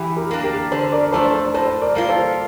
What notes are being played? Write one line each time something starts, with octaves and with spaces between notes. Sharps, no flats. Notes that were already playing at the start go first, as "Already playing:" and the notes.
Already playing: E3 E4 G4
G4 A#4
A#3 D4
G4 A#4
D3 A4 C5
A#4 D5
F3 A3 D4 A4 C5
A4 C5
A2 A4 C5
A#4 D5
G3 A#3 F4
A4 C5